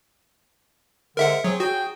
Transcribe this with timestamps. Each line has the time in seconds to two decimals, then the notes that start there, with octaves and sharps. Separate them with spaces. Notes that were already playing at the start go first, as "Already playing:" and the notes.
1.17 G#2 D3 A#4 E5 F#5
1.44 F#3 C4 G#4 C#5
1.60 F#3 F#4 G#4 G5